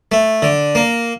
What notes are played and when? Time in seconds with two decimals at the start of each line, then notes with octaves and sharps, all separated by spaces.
0.12 A3
0.42 D3
0.75 A#3